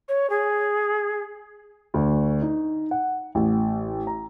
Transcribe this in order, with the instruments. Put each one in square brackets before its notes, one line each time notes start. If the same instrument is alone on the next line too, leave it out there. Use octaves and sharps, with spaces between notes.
[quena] C#5
G#4
[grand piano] D2
D#4
F#5
A1
A#5